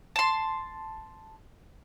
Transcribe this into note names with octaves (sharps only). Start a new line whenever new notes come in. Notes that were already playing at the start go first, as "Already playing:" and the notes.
A5 C6